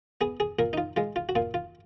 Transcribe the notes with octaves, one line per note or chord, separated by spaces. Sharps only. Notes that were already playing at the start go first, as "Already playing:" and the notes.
B3 G#4
G#4
A#2 A#4
D#4
F4
G#3 F4
F4
F#4
A#2 F4
F4